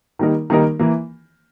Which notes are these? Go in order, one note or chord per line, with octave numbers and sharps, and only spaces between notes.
D#3 G3 A#3 D#4 A#4
D#3 G3 A#3 D#4 A#4
E3 A#3